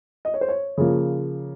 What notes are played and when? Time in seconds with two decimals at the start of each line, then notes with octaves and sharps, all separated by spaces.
0.25 D#5
0.34 C#5
0.41 C5
0.49 C#5
0.78 C#3 F3 A#3